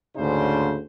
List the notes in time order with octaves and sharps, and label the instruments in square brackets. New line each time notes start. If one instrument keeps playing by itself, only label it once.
[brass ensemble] D2 G#2 C#3 D4 C5